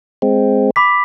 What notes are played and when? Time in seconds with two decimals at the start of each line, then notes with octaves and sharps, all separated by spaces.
0.22 G#3 C4
0.76 B5 D6 B6